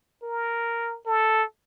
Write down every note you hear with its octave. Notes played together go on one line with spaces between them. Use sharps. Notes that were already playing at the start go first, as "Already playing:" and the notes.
A#4
A4